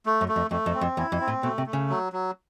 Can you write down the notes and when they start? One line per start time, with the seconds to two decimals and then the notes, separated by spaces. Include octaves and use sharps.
0.06 A3
0.21 F#2
0.28 A3
0.36 F2
0.51 F2 A3
0.66 F2
0.74 C4
0.81 F2
0.97 E2 E4
1.12 F2
1.20 C4
1.28 A2
1.43 B2 A3
1.58 C3
1.66 A3
1.73 C#3
1.90 F#3
2.13 F#3